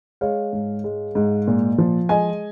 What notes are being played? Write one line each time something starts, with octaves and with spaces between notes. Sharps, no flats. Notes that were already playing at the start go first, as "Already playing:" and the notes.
G#3 C#5 F5
G#2
G#3
G#2
A#2
F3
G#3 D#5 G#5